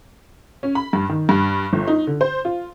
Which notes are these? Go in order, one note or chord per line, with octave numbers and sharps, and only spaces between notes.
C#4
B5
G2
D#3
G2
G1
D#4
D3
C5
F4